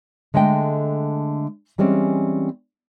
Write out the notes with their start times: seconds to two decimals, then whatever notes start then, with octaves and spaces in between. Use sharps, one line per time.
0.34 D3 G#3 A3 D#5 G5
1.78 E3 G3 G#3 C4 C#4